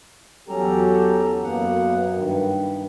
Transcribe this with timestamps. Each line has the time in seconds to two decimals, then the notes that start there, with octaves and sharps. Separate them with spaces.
0.49 E2 F#3 C#4 G4 A4 A#5
1.43 F#2 A#3 B3 F#5
2.15 G2 D#3